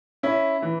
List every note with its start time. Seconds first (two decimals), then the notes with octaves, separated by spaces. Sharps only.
0.23 C#4 E4
0.62 E3